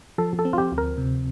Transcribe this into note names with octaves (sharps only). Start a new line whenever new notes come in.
F3 A4
A4
C4
F4
G4
D2
A#4
C3